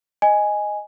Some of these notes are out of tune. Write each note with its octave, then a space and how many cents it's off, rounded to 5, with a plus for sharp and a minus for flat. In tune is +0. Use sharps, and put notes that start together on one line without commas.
D#5 -5 G#5 +0